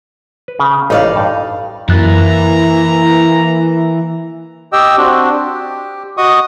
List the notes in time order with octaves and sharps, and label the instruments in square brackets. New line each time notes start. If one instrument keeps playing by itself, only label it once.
[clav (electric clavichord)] B4
C#3
[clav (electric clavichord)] A1 [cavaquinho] D#4 D5 F5
[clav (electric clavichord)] G2
[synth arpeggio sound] F#2 F#6 A6 [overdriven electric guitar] E3 [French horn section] A#3 E4 [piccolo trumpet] A#5
[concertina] G4 D#5 G5 E6
C4 D4 F#4
G4
F#4 D#5 C#6 D#6